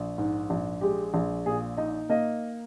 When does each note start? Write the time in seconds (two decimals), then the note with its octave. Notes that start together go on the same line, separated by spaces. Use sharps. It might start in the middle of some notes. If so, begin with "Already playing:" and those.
Already playing: A#1
0.18 G#2
0.50 A#1
0.81 G#3 G4
1.14 A#1
1.46 A#2 G#4
1.77 D#4 D#5
2.09 A#3 D#5